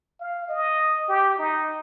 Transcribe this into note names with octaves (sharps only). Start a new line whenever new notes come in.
F5
D#5
G4
D#4